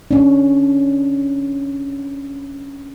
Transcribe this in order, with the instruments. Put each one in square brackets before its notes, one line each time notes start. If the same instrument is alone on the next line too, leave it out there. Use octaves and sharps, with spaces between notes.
[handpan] C#4 D4